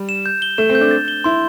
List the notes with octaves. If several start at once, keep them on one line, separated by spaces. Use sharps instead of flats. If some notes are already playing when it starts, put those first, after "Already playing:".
Already playing: G3
E7
G6
G7
A3 E7
C4
G6
D4
A6
G7
E4 C6